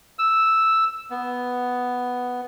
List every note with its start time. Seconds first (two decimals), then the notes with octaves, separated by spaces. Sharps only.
0.19 E6
1.11 B3